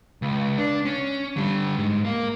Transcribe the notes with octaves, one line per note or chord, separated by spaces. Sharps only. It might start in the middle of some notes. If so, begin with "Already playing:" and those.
C#2
D4
C#4
D3 G3
G#2
A#3